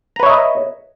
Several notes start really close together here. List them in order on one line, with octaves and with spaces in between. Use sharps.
A#5 B4 C#5 E5 D#5